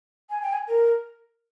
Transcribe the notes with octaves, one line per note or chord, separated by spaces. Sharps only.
G#5
G5
G#5
A#4